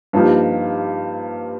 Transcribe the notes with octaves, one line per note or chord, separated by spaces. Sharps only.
G2 F3 A#3 D#4 G4